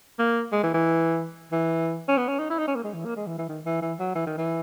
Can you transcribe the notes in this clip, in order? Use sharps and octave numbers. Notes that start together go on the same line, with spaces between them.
A#3
G#3
E3
E3
E3
C#4
B3
C#4
D#4
E4
D#4
C#4
A#3
G#3
E3
A#3
G#3
E3
E3
D#3
E3
E3
F#3
E3
D#3
E3